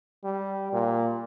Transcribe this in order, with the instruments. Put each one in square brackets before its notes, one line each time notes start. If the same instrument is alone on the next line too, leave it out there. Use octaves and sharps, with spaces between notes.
[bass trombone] G3
A#2